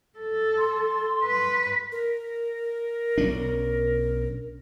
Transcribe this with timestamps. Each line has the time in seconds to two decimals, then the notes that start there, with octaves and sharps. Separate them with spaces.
0.19 A4
0.58 C6
1.24 B4
1.92 A#4
3.18 B1 C#4 D4